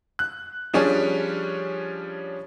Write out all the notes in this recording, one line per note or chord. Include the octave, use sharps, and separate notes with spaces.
F#6
F3 G3 C#4 D4 G#4 C#5